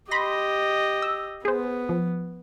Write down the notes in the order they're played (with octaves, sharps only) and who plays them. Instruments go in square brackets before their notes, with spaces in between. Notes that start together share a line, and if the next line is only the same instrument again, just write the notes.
[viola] G4 D#5 [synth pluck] B5 C6 A#6
[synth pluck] E6
[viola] B3 [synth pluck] G#4 C5
[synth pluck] F3